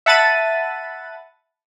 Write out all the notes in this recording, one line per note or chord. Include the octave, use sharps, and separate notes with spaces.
E5 F#5 A5 B5 A6 D#7